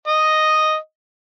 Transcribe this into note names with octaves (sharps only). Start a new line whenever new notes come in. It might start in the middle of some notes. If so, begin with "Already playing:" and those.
D#5